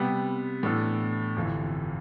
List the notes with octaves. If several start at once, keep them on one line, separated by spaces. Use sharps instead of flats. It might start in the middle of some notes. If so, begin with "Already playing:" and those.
Already playing: C3 G3 B3
A2 E3 B3 D4 A4
G1 F2 E3